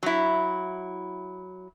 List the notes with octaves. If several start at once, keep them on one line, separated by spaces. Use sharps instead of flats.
F#3 E4